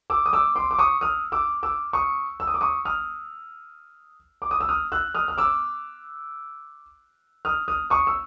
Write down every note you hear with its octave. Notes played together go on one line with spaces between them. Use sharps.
D6 E6
D#6
D6 E6
C6 D6
D6
C#6 D#6
D#6 F6
D6 E6
D6 E6
C#6 D#6
E6
D#6
D6
C#6 D#6
D#6 F6
D6
D#6
E6
D#6 F6
E6 F#6
D#6 F6
F6
D6 E6
D#6 F6
D#6 F6
C#6 D#6
E6